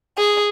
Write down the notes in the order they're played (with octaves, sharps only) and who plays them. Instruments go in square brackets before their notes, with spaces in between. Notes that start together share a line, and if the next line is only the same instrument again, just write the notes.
[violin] G#4